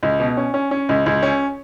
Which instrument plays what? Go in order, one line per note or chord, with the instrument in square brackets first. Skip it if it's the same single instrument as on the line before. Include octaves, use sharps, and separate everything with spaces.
[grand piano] C#2
B2
C#4
C#4
C#4
C#2
C#2
C#4